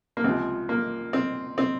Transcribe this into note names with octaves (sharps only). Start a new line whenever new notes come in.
A#3
C#2 C3 F3 C4
A#3
C4
C4